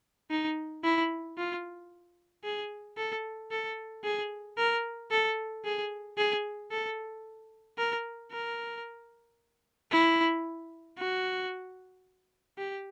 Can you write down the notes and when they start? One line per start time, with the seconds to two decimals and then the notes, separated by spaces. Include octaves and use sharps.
0.31 D#4
0.84 E4
1.38 F4
2.44 G#4
2.97 A4
3.51 A4
4.04 G#4
4.58 A#4
5.11 A4
5.65 G#4
6.18 G#4
6.71 A4
7.78 A#4
8.31 A#4
9.91 E4
10.98 F#4
12.58 G4